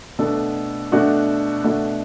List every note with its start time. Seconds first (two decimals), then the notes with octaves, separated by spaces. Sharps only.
0.19 B2 A3 D4 F#4 A4
0.92 B2 A3 D4 F#4 A4
1.64 B2 A3 D4 F#4 A4